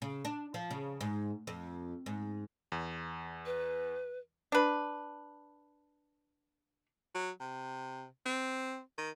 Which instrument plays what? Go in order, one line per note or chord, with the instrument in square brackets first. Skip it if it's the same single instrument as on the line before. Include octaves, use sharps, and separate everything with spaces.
[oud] C#3
D4
F3
C#3
G#2
F2
G#2
[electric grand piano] E2
[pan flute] B4
[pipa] D4 B4
[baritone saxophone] F#3
C3
C4
D#3